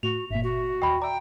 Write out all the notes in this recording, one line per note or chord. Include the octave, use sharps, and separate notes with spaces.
A2 F#4 F7
G1 A#2 E5
F#4
D#2 D#5 G5 B5
D5 E5 G5 A#5